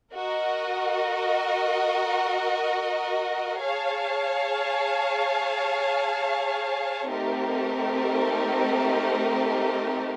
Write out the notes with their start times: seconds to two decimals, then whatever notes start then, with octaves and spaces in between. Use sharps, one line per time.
0.12 F#4 A#4 D#5
3.60 G#4 C#5 F5 A5
7.08 A3 C4 D#4 G4 A#4